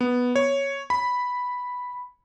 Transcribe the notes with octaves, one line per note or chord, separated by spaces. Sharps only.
B3
C#5
B5